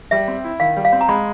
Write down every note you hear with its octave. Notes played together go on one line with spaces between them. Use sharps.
G3 E5
C4
E4
D#3 F5
G3
F5
C4
A#5
G#3 B5